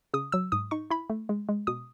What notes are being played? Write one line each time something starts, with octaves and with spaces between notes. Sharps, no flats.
C#3 D#6
F#3 E6
G#2 D#6
D#4 C#6
E4 B5
A3
G#3
G#3
B2 D#6